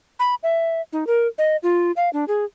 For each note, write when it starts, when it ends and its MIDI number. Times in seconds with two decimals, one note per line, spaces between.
0.19 0.35 83
0.43 0.81 76
0.93 1.07 63
1.07 1.27 70
1.38 1.57 75
1.63 1.92 65
1.96 2.10 77
2.13 2.25 62
2.28 2.45 68